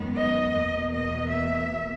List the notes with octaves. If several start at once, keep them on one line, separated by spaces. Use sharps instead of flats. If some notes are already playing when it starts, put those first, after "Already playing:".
Already playing: F#2 D#3 G#3 B3
D#5
E2 B2 A#3
D#5
E5